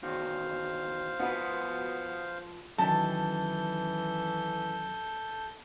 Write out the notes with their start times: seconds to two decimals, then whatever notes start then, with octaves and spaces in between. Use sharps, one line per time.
0.03 E2 D#3 F#4 C5 F5
1.19 F3 B3 F#4 B4
2.78 F#2 D#3 E3 A4 A5 G6